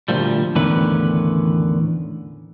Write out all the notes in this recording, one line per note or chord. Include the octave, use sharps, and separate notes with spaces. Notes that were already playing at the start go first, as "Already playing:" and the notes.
D2 A#2 F3 G3
E2 A2 D3 D#3 C#4 B4